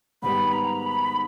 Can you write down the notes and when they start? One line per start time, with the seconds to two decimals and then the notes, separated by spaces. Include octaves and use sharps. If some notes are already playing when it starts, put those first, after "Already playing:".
0.22 G#2 D#3 G3 B3 B5
0.53 A#5
0.83 B5